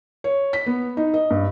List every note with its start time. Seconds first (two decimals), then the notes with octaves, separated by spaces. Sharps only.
0.24 C#5
0.53 B6
0.66 B3
0.97 D#4
1.14 D#5
1.30 G2